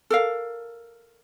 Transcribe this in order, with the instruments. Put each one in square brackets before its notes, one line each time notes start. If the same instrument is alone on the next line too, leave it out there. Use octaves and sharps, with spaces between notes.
[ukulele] A4 A#4 F5